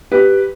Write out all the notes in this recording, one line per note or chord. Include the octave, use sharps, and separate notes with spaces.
G4 B4